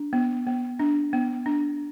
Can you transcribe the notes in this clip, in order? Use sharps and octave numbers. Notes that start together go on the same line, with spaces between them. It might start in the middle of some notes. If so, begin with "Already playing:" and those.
Already playing: D4
B3
B3
D4
B3
D4